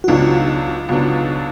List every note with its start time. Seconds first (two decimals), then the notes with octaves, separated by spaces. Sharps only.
0.04 F#4
0.08 C#2 B2 F#3 B3 D4 D#4 F4
0.89 C#2 B2 F#3 B3 D4